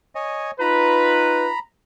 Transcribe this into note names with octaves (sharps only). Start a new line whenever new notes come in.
C#5 D#5 G#5
D#4 F4 B4 A#5 B5